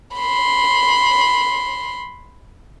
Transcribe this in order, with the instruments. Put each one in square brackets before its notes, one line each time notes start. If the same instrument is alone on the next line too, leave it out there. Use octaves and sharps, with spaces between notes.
[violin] B5 C6